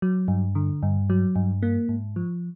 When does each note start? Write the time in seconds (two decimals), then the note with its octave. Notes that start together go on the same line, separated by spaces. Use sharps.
0.02 F#3
0.28 G2
0.55 D3
0.83 G2
1.10 F#3
1.36 G2
1.63 A#3
1.89 G#2
2.16 F3